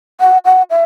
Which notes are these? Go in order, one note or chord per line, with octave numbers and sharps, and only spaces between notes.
F#5
F#5
E5